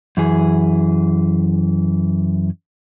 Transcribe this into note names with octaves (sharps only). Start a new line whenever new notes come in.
F#2 E3 G#4